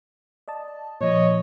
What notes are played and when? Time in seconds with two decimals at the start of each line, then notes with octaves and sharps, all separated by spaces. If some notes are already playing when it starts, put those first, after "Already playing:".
0.48 D5 D#5 A5
1.01 A#2 F3 C#5 D#5